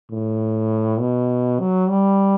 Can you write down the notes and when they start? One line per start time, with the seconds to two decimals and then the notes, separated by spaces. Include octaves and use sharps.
0.11 A2
1.00 B2
1.60 F#3
1.90 G3